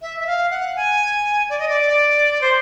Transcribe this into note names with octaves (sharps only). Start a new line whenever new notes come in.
E5
E5
F5
F#5
G#5
D5
D#5
D5
C5